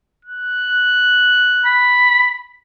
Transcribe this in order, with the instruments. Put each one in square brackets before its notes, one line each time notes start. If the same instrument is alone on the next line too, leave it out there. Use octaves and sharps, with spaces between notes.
[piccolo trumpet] F#6
[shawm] B5